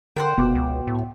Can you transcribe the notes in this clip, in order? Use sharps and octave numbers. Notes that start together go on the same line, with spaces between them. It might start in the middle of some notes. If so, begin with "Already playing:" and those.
D3 A#4 C5 F#5 G5
F1 B2 D6
C#2
A2